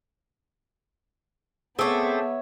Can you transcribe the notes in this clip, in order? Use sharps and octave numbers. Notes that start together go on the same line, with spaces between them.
A3 B3 C4 G#4 C#5 E5 A5 D6